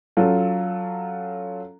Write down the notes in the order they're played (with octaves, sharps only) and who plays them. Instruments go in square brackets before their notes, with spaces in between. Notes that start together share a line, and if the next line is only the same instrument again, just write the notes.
[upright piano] F#3 C#4 F4 A4